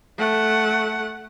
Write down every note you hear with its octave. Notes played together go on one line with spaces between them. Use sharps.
A3 F#5